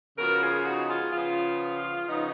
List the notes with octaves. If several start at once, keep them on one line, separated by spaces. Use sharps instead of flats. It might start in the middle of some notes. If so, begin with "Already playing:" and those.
C#3 F3 B3 F#4 A#4
F4 G#4
D#4 F#4
F4 G#4
C#3 F3 B3 F4
C#3 F3 B3 D#4